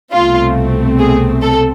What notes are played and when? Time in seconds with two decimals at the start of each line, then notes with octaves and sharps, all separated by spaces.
0.12 C2 B2 A3 C4 F4
0.99 G#4
1.42 A4